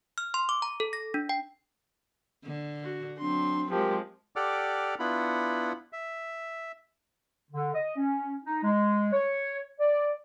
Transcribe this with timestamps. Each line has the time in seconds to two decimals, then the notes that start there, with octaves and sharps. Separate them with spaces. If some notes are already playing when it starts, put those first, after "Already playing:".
0.18 F6
0.34 C6
0.49 D6
0.62 A#5
0.80 A4
0.93 A#6
1.14 D4
1.29 G5
2.45 D3
2.83 F#4
3.19 F#3 C4 D4 C6
3.71 F3 G#3 G4 A#4
4.36 G4 A4 D5 F#5 D6 F6
5.00 B3 D4 E4 F4 F#5 B5
5.93 E5
7.51 D3
7.73 D#5
7.96 C#4
8.44 D#4
8.63 G#3
9.12 C#5
9.79 D5